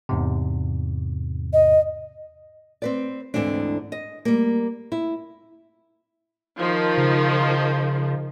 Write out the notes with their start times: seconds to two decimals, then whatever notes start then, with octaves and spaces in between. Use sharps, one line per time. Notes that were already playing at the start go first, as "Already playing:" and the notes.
0.09 E2 G#2 C3
1.53 D#5
2.82 C4 B4 D5
3.34 D2 G#2 D3 E3 C4 D4
3.92 D#5
4.25 G3 A#3
4.92 E4
6.58 D#3 F3
6.97 C#3